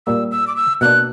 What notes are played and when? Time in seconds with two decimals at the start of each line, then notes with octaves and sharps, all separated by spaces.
0.07 A#2 G3 A#3 E6
0.31 E6
0.48 D6
0.56 E6
0.81 B2 A#3 D4 F#6